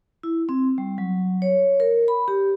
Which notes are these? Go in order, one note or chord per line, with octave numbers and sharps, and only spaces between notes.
E4
C4
G3
F#3
C#5
A#4
B5
G4